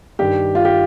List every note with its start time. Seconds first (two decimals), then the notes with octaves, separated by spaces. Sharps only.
0.19 G2 D#3 G4
0.55 F4
0.65 G4